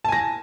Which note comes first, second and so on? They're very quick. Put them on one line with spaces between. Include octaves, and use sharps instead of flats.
A5 G#5 A#6